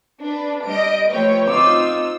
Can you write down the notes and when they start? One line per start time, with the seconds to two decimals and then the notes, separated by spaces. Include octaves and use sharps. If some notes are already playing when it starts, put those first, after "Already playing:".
0.22 D4 B4
0.65 G3 D#5 D7
1.10 F3 A3 B4 C#5 G5
1.47 C4 D#4 F4 D6 E6